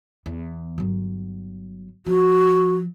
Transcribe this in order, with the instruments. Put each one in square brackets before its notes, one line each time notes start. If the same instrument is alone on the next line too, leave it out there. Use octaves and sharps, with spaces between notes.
[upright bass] E2
G1 F#3
[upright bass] F3 [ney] F#4